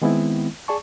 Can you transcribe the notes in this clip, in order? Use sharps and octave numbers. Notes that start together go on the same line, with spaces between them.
D#3 G#3 B3 C4 E4
G#4 D5 A5 C#6